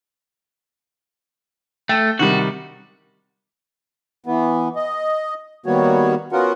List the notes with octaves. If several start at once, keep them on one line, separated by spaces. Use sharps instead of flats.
A3 G5
C3 D#3 G3 F#4
E3 B3
D#5
D#3 G3 A#3 B3 F#4 C#5
B3 C#4 F4 F#4 A#4 F#5